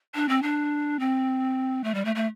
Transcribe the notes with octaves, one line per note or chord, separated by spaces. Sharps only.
D4
C4
D4
C4
A3
G3
A3
A3